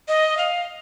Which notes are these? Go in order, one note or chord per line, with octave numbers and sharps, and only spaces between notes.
D#5
F5